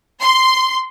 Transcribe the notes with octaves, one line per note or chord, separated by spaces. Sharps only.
C6